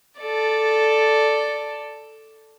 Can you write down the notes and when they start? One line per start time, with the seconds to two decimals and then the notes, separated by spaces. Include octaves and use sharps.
0.21 A4 D5